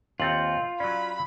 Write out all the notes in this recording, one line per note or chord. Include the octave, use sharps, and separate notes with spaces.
D#2 C4 F4 F#5 G6 A6 F#7
F#3 C#4 D5 B5